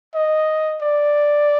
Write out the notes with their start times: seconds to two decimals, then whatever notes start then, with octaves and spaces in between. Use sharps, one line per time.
0.14 D#5
0.82 D5